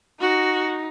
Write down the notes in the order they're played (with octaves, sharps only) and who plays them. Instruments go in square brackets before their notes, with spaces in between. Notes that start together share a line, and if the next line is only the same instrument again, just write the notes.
[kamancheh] D#4 [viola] F#4